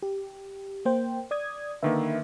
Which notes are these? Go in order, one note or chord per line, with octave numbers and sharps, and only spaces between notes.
G4
A#3 C5 G5
D5 D#6 G#6
D3 D#3 A#3 B4 E5